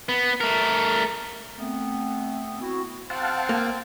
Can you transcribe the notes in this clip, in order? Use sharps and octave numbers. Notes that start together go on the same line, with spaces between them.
B3
A3 A#4
A3 B3 C4
B3 C4 E4 F#4
C4 F5 F#5 A5
A#3